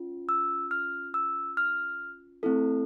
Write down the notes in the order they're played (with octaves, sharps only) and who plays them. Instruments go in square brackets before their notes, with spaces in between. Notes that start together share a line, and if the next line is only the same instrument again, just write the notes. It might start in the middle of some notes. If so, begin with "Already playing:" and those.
Already playing: [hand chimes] C#4 F4
E6
F6
E6
F6
A3 C4 E4 A4